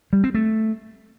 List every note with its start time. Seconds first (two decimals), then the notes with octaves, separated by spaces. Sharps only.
0.13 G3
0.24 C4
0.35 A3